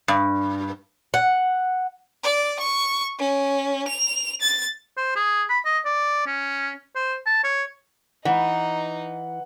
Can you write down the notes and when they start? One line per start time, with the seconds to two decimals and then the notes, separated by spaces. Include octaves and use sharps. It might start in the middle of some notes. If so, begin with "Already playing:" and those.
0.08 G2
1.14 F#5
2.24 D5
2.60 C#6
3.19 C#4
3.88 F7
4.41 A6
4.97 C5
5.16 G#4
5.50 B5
5.65 D#5
5.85 D5
6.26 C#4
6.96 C5
7.26 A5
7.44 C#5
8.25 E3 D#4 F#5